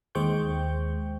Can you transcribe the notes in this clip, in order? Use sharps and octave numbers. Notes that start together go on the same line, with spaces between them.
D#2 G#3 C5 G5 C#6 G6